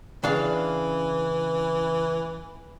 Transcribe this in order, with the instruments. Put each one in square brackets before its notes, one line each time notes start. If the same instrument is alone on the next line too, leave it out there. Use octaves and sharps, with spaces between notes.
[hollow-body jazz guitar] C#3 D4 F5 [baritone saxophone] E3